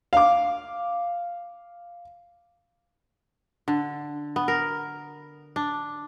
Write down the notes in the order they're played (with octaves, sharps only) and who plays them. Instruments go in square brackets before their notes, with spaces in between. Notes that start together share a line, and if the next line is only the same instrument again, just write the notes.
[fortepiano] F5 D6
[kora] D3
B3
A#4
D4